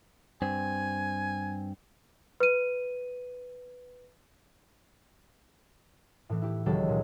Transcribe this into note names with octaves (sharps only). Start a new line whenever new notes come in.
G2 C4 G#5
B4 D#7
A2 E3
E4 G4
C#2 D#3 F#3 G4 A4
A#2 G#3